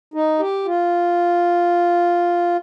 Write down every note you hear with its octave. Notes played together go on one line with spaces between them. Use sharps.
D#4
G4
F4